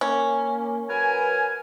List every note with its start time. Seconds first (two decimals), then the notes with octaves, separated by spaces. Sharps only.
0.01 A#3 C#4
0.89 F#3 A#4 B4 G#5